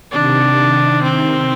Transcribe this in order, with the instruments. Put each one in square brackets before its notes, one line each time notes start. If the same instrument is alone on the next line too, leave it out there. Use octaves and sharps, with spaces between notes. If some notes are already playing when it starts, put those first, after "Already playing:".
[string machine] C3 D#3 [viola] D4
[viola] C4